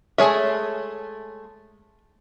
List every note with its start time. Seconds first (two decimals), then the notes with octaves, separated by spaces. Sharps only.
0.18 G#3 A3 G#4 C#5 E5